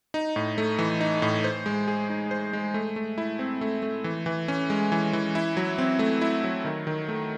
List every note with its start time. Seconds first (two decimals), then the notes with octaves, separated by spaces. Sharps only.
0.14 D#4
0.36 A2
0.58 A3
0.79 E3
1.01 D#4
1.22 A2
1.44 C5
1.66 G#3
1.88 G#4
2.10 D#4
2.31 C5
2.53 G#3
2.74 A3
2.96 A3
3.18 E4
3.39 C4
3.61 A3
3.83 A3
4.04 E3
4.26 E3
4.48 C#4
4.70 G#3
4.92 E3
5.13 E3
5.35 E4
5.57 F#3
5.78 C4
5.99 A3
6.22 E4
6.44 F#3
6.65 D#3
6.87 D#3
7.08 A3